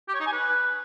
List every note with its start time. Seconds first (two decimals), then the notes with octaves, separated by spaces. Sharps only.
0.08 G4
0.14 C#5
0.20 D#4
0.26 G#5
0.32 B4